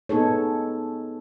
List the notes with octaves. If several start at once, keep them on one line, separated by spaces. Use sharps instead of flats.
B3 D#4 G#4 A4 C#5